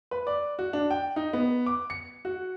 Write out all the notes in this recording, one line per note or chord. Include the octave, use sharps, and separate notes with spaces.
B4
D5
F#4
D4
G5
D#4
B3
D6
C#7
F#4